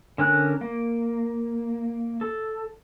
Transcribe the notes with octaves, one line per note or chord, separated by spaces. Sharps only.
D3 C#4 A#4 F#6
A#3
A4